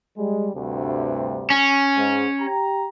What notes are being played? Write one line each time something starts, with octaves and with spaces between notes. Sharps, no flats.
G3 G#3
D2 G2 C3
C#4
G#2
G4 G5 A#5